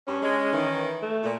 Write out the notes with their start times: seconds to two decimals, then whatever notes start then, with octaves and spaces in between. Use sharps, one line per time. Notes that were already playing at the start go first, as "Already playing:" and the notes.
0.07 G2 C#4
0.22 G#3
0.53 D#3 E3
1.02 A3
1.23 A#2